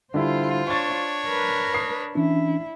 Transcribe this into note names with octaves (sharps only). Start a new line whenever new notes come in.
D3 G3 E4 F4 C5
D4 C#5 C#6 A6
A#4 B4
D#6 C7
E3 C#4 D4 E4